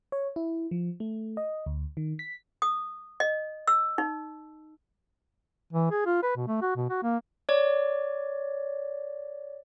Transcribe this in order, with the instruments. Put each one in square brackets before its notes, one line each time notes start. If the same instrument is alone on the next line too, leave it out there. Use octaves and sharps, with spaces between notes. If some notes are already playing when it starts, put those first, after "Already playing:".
[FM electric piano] C#5
E4
F3
A3
D#5
D2
D#3
B6
[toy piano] D#6
D#5
E6
D#4
[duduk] E3
G#4
F4
B4
B2
A3
F#4
B2
F#4
A#3
[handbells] C#5 D5